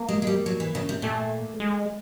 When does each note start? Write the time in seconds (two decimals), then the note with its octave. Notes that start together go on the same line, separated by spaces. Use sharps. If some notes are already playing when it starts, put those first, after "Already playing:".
Already playing: A#3
0.09 G#3
0.22 G#3
0.27 G3
0.46 F#3
0.60 E3
0.75 C#3
0.89 C3
1.02 A#2 A3
1.60 G#3